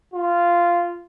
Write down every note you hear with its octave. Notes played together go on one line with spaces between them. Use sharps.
F4